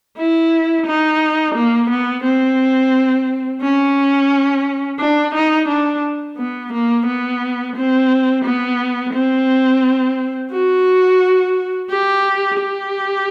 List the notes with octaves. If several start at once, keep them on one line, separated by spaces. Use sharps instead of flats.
E4
D#4
A#3
B3
C4
C#4
D4
D#4
D4
B3
A#3
B3
C4
B3
C4
F#4
G4
G4